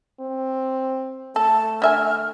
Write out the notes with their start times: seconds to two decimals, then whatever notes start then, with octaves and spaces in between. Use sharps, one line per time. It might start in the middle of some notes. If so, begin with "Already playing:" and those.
0.20 C4
1.36 A3 A4 A5
1.82 D3 E5 G#5 F6